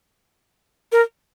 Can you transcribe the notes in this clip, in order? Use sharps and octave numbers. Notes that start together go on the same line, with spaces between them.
A#4